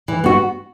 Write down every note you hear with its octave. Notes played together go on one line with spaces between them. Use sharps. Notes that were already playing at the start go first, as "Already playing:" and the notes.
E3
B3 F#4